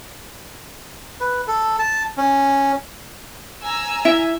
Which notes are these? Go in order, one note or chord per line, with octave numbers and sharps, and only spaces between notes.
B4
A4
A5
C#4
G#5 A#5 E6
E4 E5